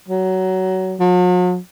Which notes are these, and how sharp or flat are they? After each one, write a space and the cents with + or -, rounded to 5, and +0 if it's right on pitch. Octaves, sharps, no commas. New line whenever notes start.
F#3 +20
F#3 -45